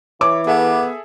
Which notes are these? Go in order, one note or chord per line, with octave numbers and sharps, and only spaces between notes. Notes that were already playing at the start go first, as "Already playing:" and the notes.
E3 C#5 D6
B3 G#4 A4 E5